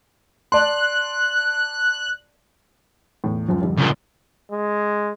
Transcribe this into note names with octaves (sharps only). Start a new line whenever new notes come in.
D5 A5 C6 F#6
E2 A2
C#2 F#2 F3
F2 D3 G3
C#2 A#2
G#3